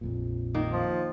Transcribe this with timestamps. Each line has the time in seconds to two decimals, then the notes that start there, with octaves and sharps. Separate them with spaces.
0.01 A#1 F2 A#2
0.54 D#3 A#3
0.72 F3